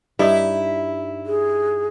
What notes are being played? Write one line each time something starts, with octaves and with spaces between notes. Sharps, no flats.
G2 D#4 E4
G#4